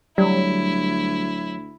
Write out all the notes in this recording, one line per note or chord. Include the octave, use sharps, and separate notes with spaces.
D2 F#3 G3 E4